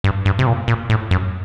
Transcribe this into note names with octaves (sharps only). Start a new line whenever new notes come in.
G2
G2
C3
A#2
A#2
A2
F#2